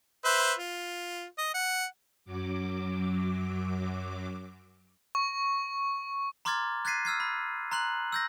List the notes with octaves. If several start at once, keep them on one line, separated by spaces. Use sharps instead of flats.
B4 C5 E5
F4
D#5
F#5
F#2 F#3 D6
C#6
A#5 C6 D6 F6 G#6 A6
F#6 G#6 A6 B6 C7 D#7
E6 F6 G#6 C7
B5
A#5 C6 F#6 F#7
E6 G6 A#6